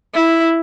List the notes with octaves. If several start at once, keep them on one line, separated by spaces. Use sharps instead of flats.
E4